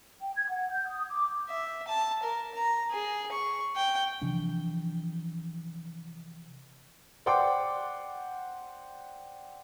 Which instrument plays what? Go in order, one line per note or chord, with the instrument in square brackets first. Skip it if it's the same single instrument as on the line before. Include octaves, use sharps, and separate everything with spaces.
[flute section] G5
G#6
F#5
G6
D#6
D6
[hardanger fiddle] E5
A5
A#4
A#5
G#4
C#6
G5
[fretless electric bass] C3 E3 F3 D4
[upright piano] C5 D5 F#5 G5 C6 D6